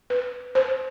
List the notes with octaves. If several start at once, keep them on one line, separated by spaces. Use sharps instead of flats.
B4
C5